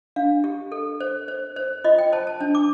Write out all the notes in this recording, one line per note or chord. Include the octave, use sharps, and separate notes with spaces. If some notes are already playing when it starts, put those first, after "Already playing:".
D4 F5
G4
A4
C5
C5
C5
F4 D#5
G5
C5 A5
A5
D4 A5
D6